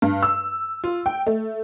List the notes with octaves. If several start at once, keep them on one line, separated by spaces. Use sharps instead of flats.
G2
E6
F4
G5
A3